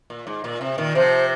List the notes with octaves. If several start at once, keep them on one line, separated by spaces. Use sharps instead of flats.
A#2
G#2
A#2
C3
A#2 D#3
C3 F3 C5